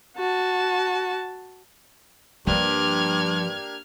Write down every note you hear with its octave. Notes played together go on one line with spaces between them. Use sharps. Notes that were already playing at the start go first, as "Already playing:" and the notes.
F#4 A5
G2 F3 G3 A#3 D4 G4 F6 G#6